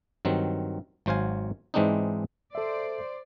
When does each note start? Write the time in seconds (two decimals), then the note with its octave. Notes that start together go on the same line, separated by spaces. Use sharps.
0.25 G2 D#3 F#3 C4
1.06 G#1 F#3 C5 F5 G#5
1.74 G#2 E3 G#3 C4 D4 D#4
2.55 A4 C5 D5 E5